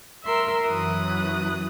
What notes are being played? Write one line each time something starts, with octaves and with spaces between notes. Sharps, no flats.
A#4 E5 C6 E6
F#2 E3 F#3 D#6 F#6